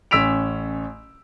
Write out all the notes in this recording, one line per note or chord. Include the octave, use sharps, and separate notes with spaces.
A1 C#4 E6 B6 D7 F7